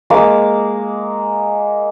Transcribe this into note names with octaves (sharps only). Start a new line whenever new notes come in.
G#3 A#3 D6